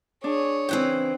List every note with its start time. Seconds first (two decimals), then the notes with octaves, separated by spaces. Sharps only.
0.24 D4 G#4 C#5
0.69 C#3 E3 C4 G5 F#6